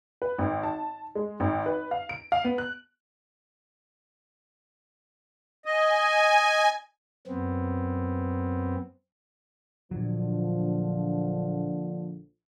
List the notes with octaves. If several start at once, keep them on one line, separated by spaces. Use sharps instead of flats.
B4
G#1
A5
G#3
G#1
B4
F5
D7
F5
B3
F#6
D#5 G#5
F#2 B3 C4
A#1 A#2 D3 F3 F#3